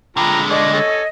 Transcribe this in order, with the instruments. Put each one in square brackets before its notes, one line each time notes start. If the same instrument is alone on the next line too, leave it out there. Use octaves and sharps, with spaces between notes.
[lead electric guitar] D3 G#3 [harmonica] F3 G5 A#5 [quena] B5
[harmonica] A3 G#4 D5 [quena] D#5
[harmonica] A4 C#5 G#5